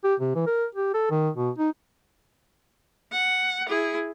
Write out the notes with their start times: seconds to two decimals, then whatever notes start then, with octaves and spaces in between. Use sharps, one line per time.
0.04 G4
0.20 C3
0.35 E3
0.47 A#4
0.75 G4
0.94 A4
1.11 D#3
1.37 B2
1.58 D#4
3.12 F#5
3.69 E4 G#4